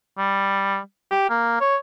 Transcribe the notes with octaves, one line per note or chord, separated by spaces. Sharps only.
G3
G4
A#3
C#5